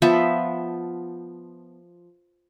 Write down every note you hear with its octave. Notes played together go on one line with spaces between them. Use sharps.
F3 B3 E5 A5